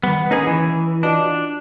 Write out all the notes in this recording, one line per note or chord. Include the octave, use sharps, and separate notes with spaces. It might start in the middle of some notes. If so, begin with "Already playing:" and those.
D#3 G3 B3
A#3 C#4 D#4 G#4 B4
E3
D4 F4 F#4 D#5